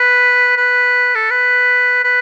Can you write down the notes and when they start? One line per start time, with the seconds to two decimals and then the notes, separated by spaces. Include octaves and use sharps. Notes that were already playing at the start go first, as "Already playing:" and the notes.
Already playing: B4
0.57 B4
1.15 A4
1.31 B4
2.05 B4